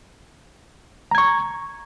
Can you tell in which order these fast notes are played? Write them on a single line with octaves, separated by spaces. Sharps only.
A#5 G#6 C#6